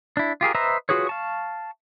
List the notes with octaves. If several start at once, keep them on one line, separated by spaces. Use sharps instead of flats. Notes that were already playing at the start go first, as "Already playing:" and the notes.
D4 E4
F4 G4 G#4 A#4
B4 C5 D#5 E5 A#5
F4 F#4 G#4 B4 C#5
F5 A5 C#6